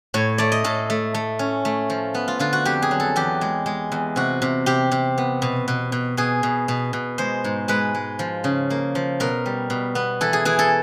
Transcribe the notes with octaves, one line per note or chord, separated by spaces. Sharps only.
A2 C#5
A3 D5
D#5
A2 A4
A3
A3
C#4
A3
F3
B3
F4
D3 F4
F#4
F2 G4
G#4
F#3
A4
E2 G4
G#3
G#3
E2
C3 F#4
C3
C3 G4
C3
B3
B2
B2
B2
B2 G#4
B2
B2
B2
G#3 C5
G#2
G#3 B4
G#3
F3
C#3
A#3
F3
B2 A#4
G3
B2
B3
E3 A4
G#4
E3 G#4
A4